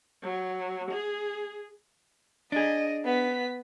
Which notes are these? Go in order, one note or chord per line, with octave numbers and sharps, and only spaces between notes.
F#3
G#4
D4 G#4 D#5
B3 B6